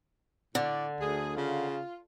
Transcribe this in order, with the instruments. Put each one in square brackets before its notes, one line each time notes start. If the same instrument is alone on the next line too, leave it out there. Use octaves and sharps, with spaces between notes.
[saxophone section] A2 D5 [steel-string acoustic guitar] D3
[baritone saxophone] D2 [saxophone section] G#4
[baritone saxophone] C#3 [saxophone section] F4